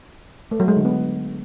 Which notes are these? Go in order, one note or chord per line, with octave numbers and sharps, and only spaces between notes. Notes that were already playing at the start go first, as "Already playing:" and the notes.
A3
F#3
G#3
D3
B3